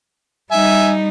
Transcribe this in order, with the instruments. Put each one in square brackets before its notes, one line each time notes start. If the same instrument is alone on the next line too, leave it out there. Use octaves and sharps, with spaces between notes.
[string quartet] G3 D#4 [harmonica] E5 G#5